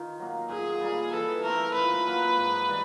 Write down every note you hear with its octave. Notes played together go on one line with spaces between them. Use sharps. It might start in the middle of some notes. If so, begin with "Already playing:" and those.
Already playing: D#3 F4
F#3 A#3
A#2 G#4
G3 A#3
E3 A4
A3 C4 A#4
A#2 B4
F#3 A#3
G#2
E3 G3